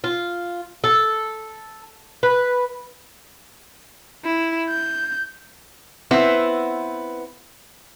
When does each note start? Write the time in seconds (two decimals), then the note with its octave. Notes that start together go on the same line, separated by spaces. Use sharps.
0.04 F4
0.84 A4
2.23 B4
4.24 E4
4.70 G6
6.11 B3 C4 E4 B4